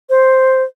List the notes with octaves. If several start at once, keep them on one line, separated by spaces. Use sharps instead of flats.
C5